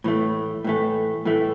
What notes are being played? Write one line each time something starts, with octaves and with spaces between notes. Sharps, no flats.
A2 E3 A3
A2 E3 A3
A2 E3 A3